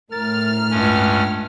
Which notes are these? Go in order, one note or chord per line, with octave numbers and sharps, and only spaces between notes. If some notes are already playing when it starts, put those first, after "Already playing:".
A2 A#4 F6 A6
C#2 G2 C#4